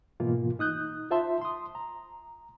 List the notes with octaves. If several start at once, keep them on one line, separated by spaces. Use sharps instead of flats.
G#2 B2 E3 A#3 F4
D#4 D#6 F#6 G6
F4 C5 E5 A5 C6
C6 D#6
A#5